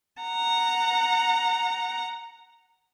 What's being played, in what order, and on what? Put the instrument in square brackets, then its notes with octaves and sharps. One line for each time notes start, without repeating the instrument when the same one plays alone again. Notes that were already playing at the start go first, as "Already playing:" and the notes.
[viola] F#5 A#5